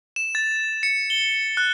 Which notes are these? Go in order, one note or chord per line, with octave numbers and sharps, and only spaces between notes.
E7
A6
C#7
G7
F#6